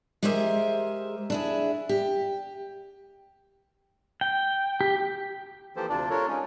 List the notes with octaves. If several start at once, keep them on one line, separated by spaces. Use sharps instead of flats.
G#3 G4 G#4 A#4 C5 E5
D4 E4 G#4
G4
G5
G4
E3 F3 A#3 G4 A4 C5
D2 C3 D4 F4 D5
D4 F4 A4 A#4 C#5
G#3 C#4 D#4